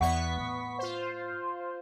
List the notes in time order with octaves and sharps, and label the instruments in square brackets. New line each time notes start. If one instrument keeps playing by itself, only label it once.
[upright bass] E2 [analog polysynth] B3 C#6 B6 [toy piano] D5 E5 F#5
[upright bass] A2
[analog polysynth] F4 C5